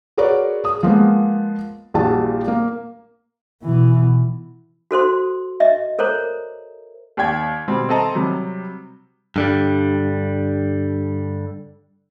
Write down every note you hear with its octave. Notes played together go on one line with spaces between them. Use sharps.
F#4 G#4 A#4 B4 C#5 D5
G#4 D#6
F3 G#3 A#3 B3
A#1 A#2 E3 G3 F#4 A5
A#3
B2 E3
F#4 A4 C5 C6
D#5 E5
A4 A#4 C5 C#5 A#5
D#2 D5 G5 G#6
B2 G3 C4
C4 A4 D#5 A5 A#5
C3 F#3 G3
G2 D3 G3